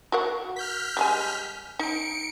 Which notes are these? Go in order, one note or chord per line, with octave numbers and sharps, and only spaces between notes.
F#4 A#4 F#5
F6 G6 B6
G3 G#3 G#5
D#4 C#7 D7